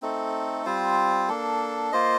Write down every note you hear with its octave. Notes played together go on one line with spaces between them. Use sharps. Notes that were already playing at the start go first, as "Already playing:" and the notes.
A3 C4 D#4 A4
G3 C4 F4 C5
A#3 D4 A4
A#3 F4 C5 D#5